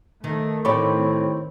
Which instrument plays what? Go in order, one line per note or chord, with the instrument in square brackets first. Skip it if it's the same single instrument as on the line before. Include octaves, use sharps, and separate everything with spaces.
[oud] D#3 [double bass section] A3
[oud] A2 G4 [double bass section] D#3 C4 [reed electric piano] C#5 B5 C#6